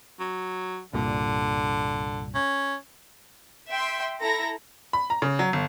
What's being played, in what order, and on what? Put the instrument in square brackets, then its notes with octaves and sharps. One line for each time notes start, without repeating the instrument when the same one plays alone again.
[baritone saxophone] F#3
[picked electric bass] C2 G2 A#2 [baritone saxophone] D3
[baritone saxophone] C#4
[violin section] E5 G5 C6
E4 A4 A#5 A#6
[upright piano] B5
A#5
C#3
F#3
G1